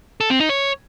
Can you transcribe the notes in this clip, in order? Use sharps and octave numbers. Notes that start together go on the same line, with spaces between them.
A4
C4
D#4
C#5